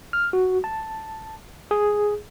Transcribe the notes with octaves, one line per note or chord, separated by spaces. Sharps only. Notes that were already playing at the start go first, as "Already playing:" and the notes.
F6
F#4
A5
G#4